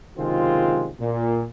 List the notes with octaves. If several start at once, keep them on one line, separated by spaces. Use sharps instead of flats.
F#1 C3 D#3 G#3 C4 F4
A#2